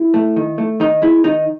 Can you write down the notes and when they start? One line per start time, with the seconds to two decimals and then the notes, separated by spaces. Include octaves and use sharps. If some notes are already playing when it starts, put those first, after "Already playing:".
Already playing: E4
0.14 A3
0.36 D#3
0.58 A3
0.80 D#3 D#4
1.02 G#3 E4
1.24 D#3 D#4